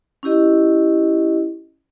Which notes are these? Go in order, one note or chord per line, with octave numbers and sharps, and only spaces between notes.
C#4 E4 G4 D#5